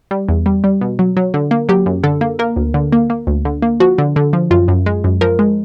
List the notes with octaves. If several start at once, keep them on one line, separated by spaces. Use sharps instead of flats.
G3
E2
G3
G3
B2
F#3
F#3
D3
A#3
F#3 G4
F#2
D3 A4
A#3
A#3 A#4
D2
D3
A#3
A#3
D2
D3
A#3
F3 F#4
D3
D3
F3
F#2 F4
F#2
G#3
F#2
F3 A#4
G#3